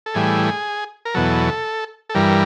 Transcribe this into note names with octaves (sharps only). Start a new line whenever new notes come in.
A4
A2 E3 G3 G#4
A#4
E2 B2 F#3 A4
A4
G2 E3 G3 A#4